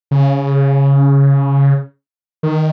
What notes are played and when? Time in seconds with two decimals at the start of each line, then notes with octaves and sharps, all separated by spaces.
0.11 C#3
2.43 D#3